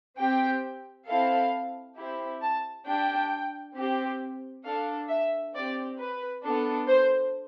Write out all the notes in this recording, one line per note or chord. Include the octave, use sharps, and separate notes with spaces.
C4 G4 G5
C4 E4 A4 F5
C4 E4 G4
A5
D4 G4 G5
C4 G4
D4 A4 F5
E5
C4 G4 D5
B4
B3 D4 A4
C5